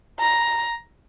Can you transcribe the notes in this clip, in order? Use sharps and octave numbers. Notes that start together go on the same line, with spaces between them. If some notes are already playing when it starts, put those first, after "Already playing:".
A#5